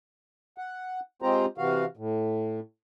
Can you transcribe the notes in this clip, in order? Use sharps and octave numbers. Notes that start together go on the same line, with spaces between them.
F#5
G#3 C4 F4 G4 C5 A#5
C3 E3 F#4 F5
A2